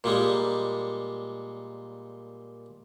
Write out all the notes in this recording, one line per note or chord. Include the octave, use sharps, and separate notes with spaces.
A#2 G3 G#3